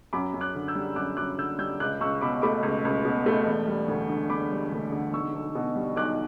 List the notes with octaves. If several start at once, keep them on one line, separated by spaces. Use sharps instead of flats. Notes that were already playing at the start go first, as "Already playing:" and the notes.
F#2 B5 D6
F#2
D6 F#6
D3
E6 G6
G3
F#2 D6 F#6
F#2 D6 F#6
D3 E6 G6
G3 E6 G6
C#2 D6 F#6
C#2 C#6 E6
B2 B5 D6
A3 B5 D6
C#2
C#2
B2
A3
E1
G3
D2
D3
E1 B5 D6
G3
D2
D3
B1 C#6 E6
B1
B2
G3
B1 D6 F#6